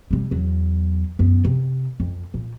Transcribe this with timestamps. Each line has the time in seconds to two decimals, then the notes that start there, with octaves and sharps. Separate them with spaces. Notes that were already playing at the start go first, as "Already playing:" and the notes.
0.11 C3 G3
0.31 E2 F#3
1.19 F#2 B3
1.45 C3
2.00 F2
2.34 A#2